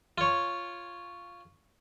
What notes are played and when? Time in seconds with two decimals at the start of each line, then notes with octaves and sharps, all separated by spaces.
0.18 F4 C#5